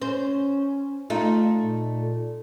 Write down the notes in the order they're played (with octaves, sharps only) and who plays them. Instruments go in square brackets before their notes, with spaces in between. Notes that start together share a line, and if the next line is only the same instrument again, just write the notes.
[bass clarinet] C#4 [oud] C5
[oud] A3 D#4 [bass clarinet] F4
[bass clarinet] A#2